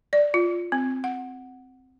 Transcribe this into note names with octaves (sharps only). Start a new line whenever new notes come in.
D5
F4
C4
F#5